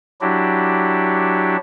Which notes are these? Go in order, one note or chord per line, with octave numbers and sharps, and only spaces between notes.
F#3 D4 E4 F#4 G4